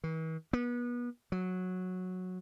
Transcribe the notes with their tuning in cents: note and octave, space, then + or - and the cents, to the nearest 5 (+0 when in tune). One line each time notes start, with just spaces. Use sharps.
E3 -45
B3 -30
F#3 -10